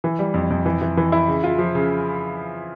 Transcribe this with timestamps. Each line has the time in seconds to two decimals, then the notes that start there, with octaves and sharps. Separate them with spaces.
0.04 E3
0.19 G3
0.34 F2
0.50 F2
0.66 E3
0.82 E3
0.97 E3
1.12 E4
1.28 C#3
1.44 F4
1.58 F3
1.75 C#3